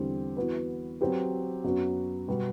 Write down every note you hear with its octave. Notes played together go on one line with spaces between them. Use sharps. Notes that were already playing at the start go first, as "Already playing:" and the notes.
Already playing: E2 D3 G3 C4 G4
E3 B3 F#4 B4
F#3 C4 G4 B4
F#2 F#3 B3 F#4
B2 G3 B3